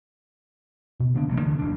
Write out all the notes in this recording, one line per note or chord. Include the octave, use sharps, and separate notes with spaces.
B2
D3 B3 D4
A1 C3 G3
D1 D3
F#1 B1 G3 D4